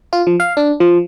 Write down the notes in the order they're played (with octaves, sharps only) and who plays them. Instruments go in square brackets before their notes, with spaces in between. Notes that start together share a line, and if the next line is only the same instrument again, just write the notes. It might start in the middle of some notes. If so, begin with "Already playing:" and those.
[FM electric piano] F4
F3
F5
D4
F3